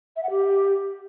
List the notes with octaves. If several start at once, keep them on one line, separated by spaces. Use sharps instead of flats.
E5
F#5
G4